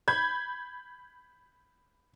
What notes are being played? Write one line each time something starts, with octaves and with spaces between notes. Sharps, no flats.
B5 G6 G#6